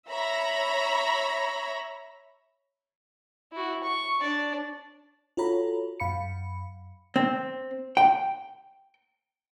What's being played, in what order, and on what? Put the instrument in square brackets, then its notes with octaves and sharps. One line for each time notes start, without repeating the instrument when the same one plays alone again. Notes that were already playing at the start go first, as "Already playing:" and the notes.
[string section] C#5 E5 A#5 B5 A#6
[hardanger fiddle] E4 F#4
C#6
D4 D5
[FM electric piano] F4 F#4 A4 C#5 A#5 B5
F#2 F5 B5 C#7
[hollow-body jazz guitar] C4
G5